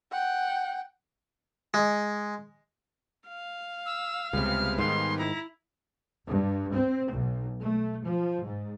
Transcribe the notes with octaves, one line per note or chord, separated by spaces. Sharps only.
F#5 G5
G#3
F5
E6
C#2 C3 G3 G#3 B3 F6
G#2 D#3 C6
E4 A#5
G2
C4
B1
A3
F3
G#2